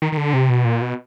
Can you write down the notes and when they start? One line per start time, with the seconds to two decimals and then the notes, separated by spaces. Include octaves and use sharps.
0.02 D#3
0.12 D#3
0.17 D3
0.34 C3
0.50 B2
0.65 A#2
0.82 B2